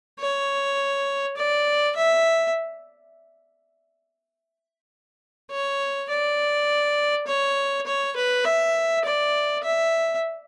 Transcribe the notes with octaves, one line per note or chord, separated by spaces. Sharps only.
C#5
D5
E5
C#5
D5
C#5
C#5
B4
E5
D5
E5